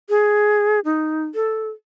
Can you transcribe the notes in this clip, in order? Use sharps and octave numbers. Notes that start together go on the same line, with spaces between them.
G#4
D#4
A4